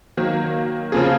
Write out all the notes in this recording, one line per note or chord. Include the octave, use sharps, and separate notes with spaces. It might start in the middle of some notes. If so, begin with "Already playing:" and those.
D#3 F#3 A#3
C#3 F3 A#3 F4 G#4